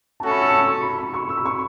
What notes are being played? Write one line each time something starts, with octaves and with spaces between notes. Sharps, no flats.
A3 C#4 F#4 A4 A5
B5
E6
E6
C#6
B5
B5
C#6
E6
B5
C#6